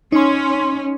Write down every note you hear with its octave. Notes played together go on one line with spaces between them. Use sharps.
C#4 D#4 C6